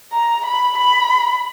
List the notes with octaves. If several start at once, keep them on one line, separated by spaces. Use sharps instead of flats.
A#5
B5
B5